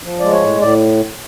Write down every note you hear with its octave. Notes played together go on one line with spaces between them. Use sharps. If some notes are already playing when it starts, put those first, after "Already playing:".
F3
G#3 D5
C#5
A2
A2 D5